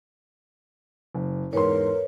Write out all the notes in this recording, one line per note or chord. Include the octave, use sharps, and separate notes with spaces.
F#1
E2 G#2 A#4 B4 C#5 C6